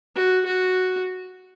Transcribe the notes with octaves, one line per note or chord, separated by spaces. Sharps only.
F#4
F#4